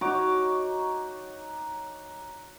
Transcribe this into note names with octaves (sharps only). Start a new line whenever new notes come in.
D#4 F#4 C#5 D6